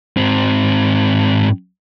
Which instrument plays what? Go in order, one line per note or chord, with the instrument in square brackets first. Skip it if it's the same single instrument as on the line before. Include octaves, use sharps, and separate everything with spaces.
[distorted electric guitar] G#2 C4